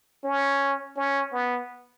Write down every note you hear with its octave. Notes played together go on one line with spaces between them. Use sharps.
C#4
C#4
B3